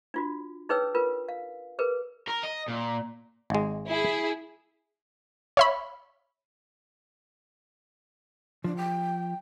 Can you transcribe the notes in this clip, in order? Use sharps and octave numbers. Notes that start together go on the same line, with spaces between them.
D4 F4 F#4
D#4 G#4 B4 C#5 G5 E6
F4 A#4 B4
F5
G#4 A#4 B4
A#4
D#5
A#2
G#1 G#3
E4 G#4
C#5 E5 B5
F3 D4
G5